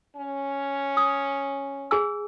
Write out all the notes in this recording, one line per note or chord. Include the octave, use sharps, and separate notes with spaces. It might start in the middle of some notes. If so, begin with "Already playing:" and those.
C#4
D#6
G#4 G#5 E6